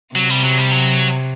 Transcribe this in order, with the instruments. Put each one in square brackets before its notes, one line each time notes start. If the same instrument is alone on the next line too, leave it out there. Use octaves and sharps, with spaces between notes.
[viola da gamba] C3 [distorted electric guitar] F#3
[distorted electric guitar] G3
F#3
G3
F#3